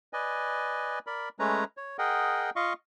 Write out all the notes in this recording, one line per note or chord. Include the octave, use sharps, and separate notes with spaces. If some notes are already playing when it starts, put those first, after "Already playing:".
B4 D5 D#5 G#5
A#4 D5 B5
G#3 A3 C#4 B4 C#5 A#5
C#5
G#4 A#4 D#5 F#5 G5
F4 D#5 F5 C#6